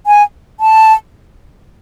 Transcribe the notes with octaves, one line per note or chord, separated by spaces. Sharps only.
G#5
A5